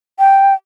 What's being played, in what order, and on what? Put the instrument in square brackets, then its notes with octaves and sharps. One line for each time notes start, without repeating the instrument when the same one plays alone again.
[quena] G5